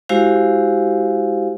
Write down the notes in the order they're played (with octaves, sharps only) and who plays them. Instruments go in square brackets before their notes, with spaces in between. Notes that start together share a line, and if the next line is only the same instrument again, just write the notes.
[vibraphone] G#3 E4 F#4 G4 C5 F5